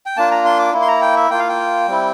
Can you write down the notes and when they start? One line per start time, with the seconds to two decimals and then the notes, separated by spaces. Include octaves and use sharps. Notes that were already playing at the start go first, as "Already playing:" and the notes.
0.06 G5
0.17 A#3 D4 F4 A5
0.31 A#5
0.45 C6
0.59 D6
0.73 A#3 E4
0.82 C6
0.88 A#5
1.02 G5
1.16 E5
1.31 A#3 F4 G5
1.39 F5
1.49 G5
1.87 G3 C4 E4